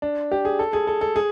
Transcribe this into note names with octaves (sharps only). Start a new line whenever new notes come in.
D4
G4
G#4
A4
G#4
A4
A4
G#4